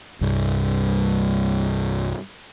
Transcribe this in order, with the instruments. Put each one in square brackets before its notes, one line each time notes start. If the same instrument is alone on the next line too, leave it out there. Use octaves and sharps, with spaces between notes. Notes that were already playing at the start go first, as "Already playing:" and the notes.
[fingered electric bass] C2 G2